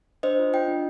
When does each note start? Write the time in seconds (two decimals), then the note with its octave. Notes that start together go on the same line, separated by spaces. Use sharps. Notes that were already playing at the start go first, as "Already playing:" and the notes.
0.23 D4 C5 D#5
0.39 F4
0.53 F4 D#5 G5
0.68 D4